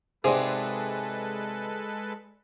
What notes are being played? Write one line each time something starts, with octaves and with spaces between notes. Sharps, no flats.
G#2 C3 G#3 G#4 A4 B4 C5 D5